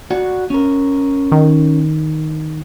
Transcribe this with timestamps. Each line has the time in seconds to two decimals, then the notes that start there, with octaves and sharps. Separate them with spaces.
0.11 F#4 D5 F#5
0.50 C#4 A#4
1.32 D#3